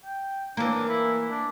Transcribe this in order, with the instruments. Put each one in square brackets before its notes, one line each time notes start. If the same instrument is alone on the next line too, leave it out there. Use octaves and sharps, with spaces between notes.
[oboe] G5
[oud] E3 A#3 [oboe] D4
[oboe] E4
D4